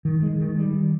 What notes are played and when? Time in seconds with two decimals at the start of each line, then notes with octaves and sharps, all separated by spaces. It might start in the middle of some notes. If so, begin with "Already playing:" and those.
0.05 D#3
0.22 G#3
0.40 D#3
0.58 G3